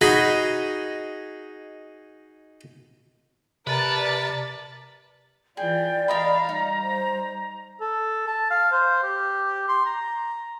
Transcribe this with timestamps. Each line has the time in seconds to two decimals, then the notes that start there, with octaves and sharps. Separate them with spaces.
0.01 D#4 F#4 G#4 D#5 B5
3.67 C3 A#4 B4 D5 A5 A6
5.57 E3 F4 G#4 D5 G5
6.08 A#4 D#5 F5 A#5 B5
6.49 G3 D#4
6.82 C5
7.81 A4
8.28 A5
8.50 F5
8.72 C5
9.04 G4
9.69 C6
9.86 A#5